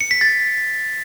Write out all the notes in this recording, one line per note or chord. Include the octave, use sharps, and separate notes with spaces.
C#7
B6
A6